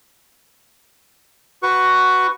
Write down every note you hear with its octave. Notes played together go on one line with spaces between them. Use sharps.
F#4 B4 C#6